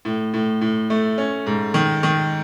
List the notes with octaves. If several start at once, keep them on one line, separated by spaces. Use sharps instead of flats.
A2
A2
A2
A3
C#4
G#2
D#3
D#3